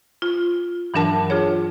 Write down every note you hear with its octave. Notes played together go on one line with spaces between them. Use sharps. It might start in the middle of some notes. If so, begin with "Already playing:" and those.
F4
G2 E3 F#3 D4 A#4 A5
D4 F4 G#4 C#5